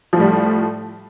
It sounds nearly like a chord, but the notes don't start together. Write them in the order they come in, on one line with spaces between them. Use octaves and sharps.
F3 A2 G3